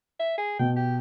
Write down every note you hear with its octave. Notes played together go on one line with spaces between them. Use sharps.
E5
G#4
B2 G5
G4